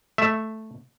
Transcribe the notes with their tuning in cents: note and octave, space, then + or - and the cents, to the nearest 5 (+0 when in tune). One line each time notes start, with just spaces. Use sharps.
A3 +0 E5 +0